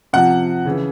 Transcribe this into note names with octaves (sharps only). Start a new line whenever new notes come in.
C3 F3 F#5
C#3 E3